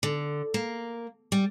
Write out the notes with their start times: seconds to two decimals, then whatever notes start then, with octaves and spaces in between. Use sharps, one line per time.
0.03 D3
0.54 A#3
1.32 G3